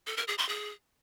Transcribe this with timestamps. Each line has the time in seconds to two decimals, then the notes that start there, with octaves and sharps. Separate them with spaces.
0.07 A4
0.17 A#4
0.28 G#4
0.38 C6
0.49 G#4